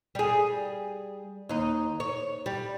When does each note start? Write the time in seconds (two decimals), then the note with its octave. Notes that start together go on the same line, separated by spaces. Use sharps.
0.15 G3 G#4
1.49 D#2 D#4
2.00 C#5
2.46 G3